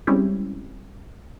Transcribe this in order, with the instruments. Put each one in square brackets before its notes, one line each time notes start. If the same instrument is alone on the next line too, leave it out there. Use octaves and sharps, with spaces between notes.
[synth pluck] G3 G#3 C4 C#4 E4 G4